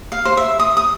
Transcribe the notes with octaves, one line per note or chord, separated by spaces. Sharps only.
F5
C5
E5
D#6
D#6